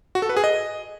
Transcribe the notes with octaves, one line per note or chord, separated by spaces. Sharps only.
F#4
A4
B4
G#4
D#5